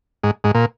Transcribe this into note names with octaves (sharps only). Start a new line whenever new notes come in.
G#2
G#2
A#2